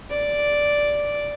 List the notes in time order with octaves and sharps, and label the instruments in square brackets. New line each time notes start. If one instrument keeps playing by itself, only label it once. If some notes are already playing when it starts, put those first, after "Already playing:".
[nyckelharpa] D5